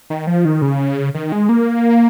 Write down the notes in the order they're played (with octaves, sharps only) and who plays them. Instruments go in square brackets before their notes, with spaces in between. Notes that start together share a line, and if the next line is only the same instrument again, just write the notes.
[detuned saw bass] D#3
F3
D#3
C#3
D#3
G#3
A#3